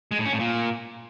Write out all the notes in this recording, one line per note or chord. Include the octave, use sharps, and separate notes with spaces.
G#3
A2
C#4
A2
A#2